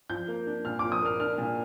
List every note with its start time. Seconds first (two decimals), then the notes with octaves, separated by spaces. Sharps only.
0.10 F3 G6
0.28 A#3
0.47 D4
0.65 A#2 F6
0.79 F3 D6
0.92 D#6
1.02 A#3 F6
1.20 D4 F6
1.38 A#2